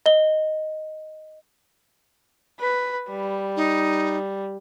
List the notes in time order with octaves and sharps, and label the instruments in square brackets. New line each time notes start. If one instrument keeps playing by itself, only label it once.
[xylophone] D#5 G7
[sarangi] B4
G3
[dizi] D#4